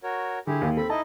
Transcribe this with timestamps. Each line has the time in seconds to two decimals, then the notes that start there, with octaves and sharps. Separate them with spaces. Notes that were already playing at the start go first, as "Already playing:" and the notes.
0.03 F#4 A#4 C#5
0.47 D3 E4 G4 G#4
0.61 D#2
0.77 C4 A4 B5
0.90 D#4 E4 D#5 A5